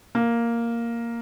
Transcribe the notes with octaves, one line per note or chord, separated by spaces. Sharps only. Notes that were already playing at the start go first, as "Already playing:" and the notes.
A#3